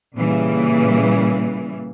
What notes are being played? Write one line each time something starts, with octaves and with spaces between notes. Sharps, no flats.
A#2 C#3 E3 G3 A#3